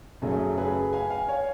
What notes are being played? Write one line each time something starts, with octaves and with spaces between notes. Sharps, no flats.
F#2 C#3 F#3 A3 G#4
G#4 B4
F5 G#5
F5 G#5
C#5 F5